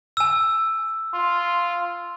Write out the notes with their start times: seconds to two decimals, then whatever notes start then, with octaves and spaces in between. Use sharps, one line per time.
0.17 G#5 E6
1.14 F4